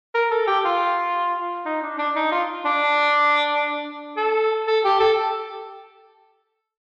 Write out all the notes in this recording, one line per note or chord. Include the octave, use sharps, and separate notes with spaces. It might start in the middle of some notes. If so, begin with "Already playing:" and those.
A#4
A4
G4
F4
D#4
D4
D4
D#4
F4
D4
A4
A4
G4
A4